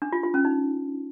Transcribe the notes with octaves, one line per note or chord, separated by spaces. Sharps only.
D4
F4
F4
C#4
D#4